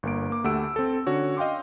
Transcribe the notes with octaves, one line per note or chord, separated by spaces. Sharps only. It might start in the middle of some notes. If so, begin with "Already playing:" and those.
G1 A#3 D7
A#3 D6
D2 A3 G4 F#5 E6 D7
C4 A4
D3 C#4 F#4 C#5
D#5 F5 G5 C6 D6